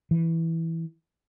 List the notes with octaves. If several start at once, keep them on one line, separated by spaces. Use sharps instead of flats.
E3